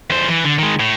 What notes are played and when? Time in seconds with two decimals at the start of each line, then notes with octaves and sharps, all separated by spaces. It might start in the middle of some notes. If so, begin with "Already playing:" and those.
0.10 E2 C5
0.28 E3
0.44 D3
0.59 D#3 G#3
0.79 A2